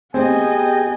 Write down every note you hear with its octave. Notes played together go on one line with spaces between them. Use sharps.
B3 C4 G4 G#4 D#5 G5 G#5